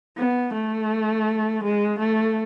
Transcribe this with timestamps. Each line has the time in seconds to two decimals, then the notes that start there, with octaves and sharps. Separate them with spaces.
0.17 B3
0.54 A3
1.64 G#3
2.00 A3